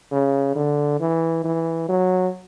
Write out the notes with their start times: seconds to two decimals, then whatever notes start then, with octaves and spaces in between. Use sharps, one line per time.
0.11 C#3
0.56 D3
1.00 E3
1.44 E3
1.89 F#3